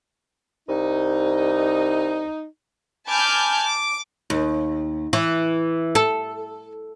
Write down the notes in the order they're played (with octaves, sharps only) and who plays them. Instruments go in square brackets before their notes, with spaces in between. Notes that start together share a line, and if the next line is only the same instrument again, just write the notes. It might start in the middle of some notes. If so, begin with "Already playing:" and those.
[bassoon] C2 [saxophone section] D#4
[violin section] G#5 A5 B5 D6 F6 G6
D6
[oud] D#2
E3
A4